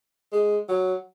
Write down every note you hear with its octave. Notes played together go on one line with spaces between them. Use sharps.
G#3
F#3